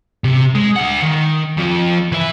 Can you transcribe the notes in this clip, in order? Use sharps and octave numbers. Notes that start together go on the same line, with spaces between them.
C3
G#3
D2 F#5
D#3
F2 F3
E3 E5